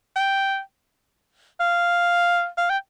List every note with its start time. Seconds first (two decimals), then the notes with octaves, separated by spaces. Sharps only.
0.16 G5
1.60 F5
2.58 F5
2.70 G5